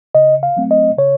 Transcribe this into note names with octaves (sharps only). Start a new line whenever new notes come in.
C#3 D#5
F5
F#3 A3 C4
D#5
C#3 C#5